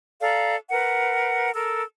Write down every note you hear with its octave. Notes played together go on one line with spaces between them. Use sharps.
A4 D5 F5 A#5
A#4 B4 F#5
A4 A#4 E6